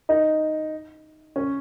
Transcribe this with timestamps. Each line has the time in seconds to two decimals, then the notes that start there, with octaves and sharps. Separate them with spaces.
0.09 D#4
1.36 C#4